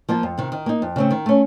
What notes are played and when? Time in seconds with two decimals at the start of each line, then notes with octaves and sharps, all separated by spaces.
0.09 F3 A#3 F4
0.23 F2
0.38 C3 D#3
0.52 D#3
0.66 A#3 D#4
0.82 F2
0.96 C#3 A3 C4
1.11 D#3
1.26 A3 C#4